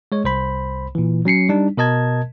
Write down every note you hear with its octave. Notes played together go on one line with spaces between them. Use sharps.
G#3 C#5
C2 C5 B5
A#2 E3
F#3 C#4 C7 C#7
G3 D4 D#4
B2 A#4 D#5 A5 G#6